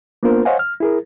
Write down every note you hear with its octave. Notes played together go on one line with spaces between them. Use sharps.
A#3 B3 D4 F4 A#4 C5
C5 C#5 D#5 F5 F#5 G#5
F6
E4 G#4 A#4